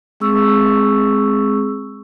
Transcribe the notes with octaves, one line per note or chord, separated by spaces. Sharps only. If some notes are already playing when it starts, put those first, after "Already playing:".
G#3 C4 G#4 C#6 E6